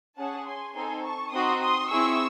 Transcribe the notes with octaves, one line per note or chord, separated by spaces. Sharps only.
C#4 G#4 F#5 A5
G#5 C6
C4 D#4 A4 G#5 C6
A5 C#6
C4 D#4 F#4 C6 D#6
C6 D#6
C4 E4 G#4 C#6 E6